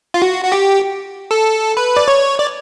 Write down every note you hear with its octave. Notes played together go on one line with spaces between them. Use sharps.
F4
F#4
F#4
G4
A4
B4
D5
C#5
D5